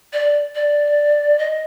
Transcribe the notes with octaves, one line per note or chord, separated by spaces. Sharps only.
D5
D5
D#5